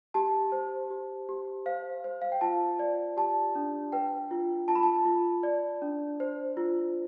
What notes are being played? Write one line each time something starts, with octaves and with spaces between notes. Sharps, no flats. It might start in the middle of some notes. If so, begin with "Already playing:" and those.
G4 A5
C5
G4
G4
C5 F5
C5
F5
G5
F4 A5
D5
G4 A5
D4
B4 G5
F4
F4 A5
B5
A5
F4
D5
D4
C5
F4